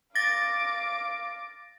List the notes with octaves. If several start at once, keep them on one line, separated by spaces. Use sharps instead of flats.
F5 D6 A6 A#6